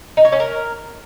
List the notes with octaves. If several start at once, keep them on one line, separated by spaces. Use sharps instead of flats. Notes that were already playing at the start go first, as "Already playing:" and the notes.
D#4
C#5
C#4
A#4